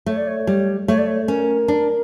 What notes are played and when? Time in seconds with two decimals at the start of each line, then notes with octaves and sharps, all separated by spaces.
0.06 A3 C#5
0.16 D5
0.27 C#5
0.47 G3
0.88 A3 C#5
0.98 D5
1.07 C#5
1.28 C#4 A#4
1.68 D4